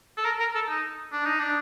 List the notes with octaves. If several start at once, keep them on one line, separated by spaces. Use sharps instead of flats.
A4
A#4
A#4
A4
D#4
D4
D#4
D4